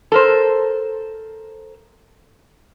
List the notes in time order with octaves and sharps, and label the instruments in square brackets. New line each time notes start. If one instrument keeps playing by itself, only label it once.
[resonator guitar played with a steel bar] A4 A#4 C5